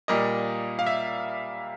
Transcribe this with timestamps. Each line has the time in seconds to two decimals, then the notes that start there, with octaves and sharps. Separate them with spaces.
0.08 A#2 G3 A#3 D#5
0.79 F5
0.87 E5